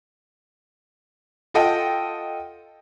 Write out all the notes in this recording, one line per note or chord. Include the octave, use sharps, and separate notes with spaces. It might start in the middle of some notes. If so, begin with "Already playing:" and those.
F4 A4 D#5 F#5 G5